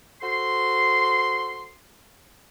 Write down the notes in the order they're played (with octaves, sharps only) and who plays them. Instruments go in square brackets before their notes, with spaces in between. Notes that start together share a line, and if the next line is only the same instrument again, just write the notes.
[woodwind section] F#4 A4 C5 C6